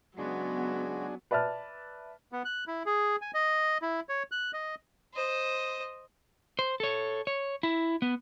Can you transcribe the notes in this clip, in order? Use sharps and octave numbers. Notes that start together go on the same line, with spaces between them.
C#3 F#3 G#3 B3 D4 F#4 G#4
B4 D5 E5 A5 F6
B3
F#6
E4
G#4
G#5
D#5
E4
C#5
F#6
D#5
C5 D#5
C5
A4 C#5
C#5
E4
B3